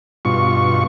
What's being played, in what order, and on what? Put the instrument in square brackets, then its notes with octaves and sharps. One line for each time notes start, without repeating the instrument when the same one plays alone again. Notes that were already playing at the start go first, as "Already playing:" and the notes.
[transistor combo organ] G2 B2 F4 C#6